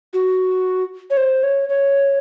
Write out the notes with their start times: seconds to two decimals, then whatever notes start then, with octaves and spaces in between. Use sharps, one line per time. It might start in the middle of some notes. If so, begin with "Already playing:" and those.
0.14 F#4
1.10 C#5
1.17 C5
1.43 C#5
1.69 C#5